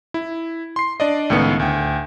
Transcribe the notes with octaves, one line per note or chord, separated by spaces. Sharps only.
E4
C6 C7
D4 D5 D#5
C#2 A2 D#3 B3 C#7
D2 G5